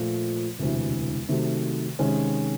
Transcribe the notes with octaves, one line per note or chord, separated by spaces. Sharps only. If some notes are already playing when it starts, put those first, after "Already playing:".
Already playing: A#2 F3 A3
E1 D2 C3 E3
C3 D#3 F#3 A3
C3 D#3 G#3 C#4